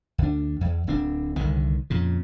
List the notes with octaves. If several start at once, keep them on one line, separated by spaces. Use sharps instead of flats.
D2 D4
E2
D1 C4 D4
C2 D3 D#3
F2 A#2 C#3